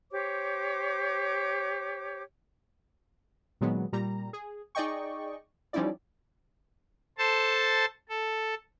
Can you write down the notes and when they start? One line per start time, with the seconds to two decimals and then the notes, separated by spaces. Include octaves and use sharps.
0.11 G4 C5 C#5 D6
3.61 A#2 D#3 F#3 G#3 B3
3.93 A#2 G3 A#5
4.33 G#4
4.75 D#4 G#4 D5 D#5 G5 C#6
5.73 F3 G3 C#4 D#4 E4 D5
7.18 A4 C5 A5
8.09 A4